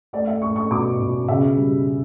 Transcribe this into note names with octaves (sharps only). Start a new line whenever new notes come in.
A3 D5
E5
A3 C#6
C#6
B2 D6
B2
C#3 E5
G3